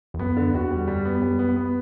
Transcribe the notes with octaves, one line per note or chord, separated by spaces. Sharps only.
E2
F#2 B3
D3
E2 F#4
G3
F#2 G3
B3
F#2 G3
B3
B3